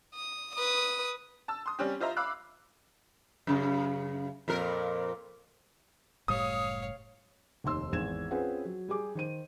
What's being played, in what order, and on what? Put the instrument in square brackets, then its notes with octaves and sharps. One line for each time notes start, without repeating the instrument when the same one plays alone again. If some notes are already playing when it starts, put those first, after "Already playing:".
[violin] D#6
B4 D#6
[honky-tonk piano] A5 E6
C6 D#6
G3 C4 C#4 G4
F4 C5 D#5 E5 A#5
F5 B5 D6 E6 F#6
[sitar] F#2 C#3
F2 A#2 A#4
[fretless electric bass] F#1 A2 G3 [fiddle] C#5 F5 [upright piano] D#6
[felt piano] F1 D#2 D#4 C6 E6
G#1 E2 G#6 E7
C4 C#4 F4 G#4 B4 F#5
F#3
G3 G4 G#4 D6
D#3 C5 D#7